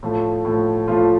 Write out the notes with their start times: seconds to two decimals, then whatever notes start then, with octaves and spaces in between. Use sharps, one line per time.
0.03 A2 F3 A3
0.45 A2 F3 A3
0.88 A2 F3 A3 F4